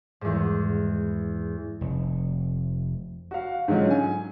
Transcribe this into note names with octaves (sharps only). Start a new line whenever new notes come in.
E2 G#2
F1
F#4 F5
G#2 D3 F#3 C#4 F4
G#5